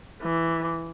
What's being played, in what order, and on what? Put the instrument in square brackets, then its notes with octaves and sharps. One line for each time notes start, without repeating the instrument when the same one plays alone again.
[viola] E3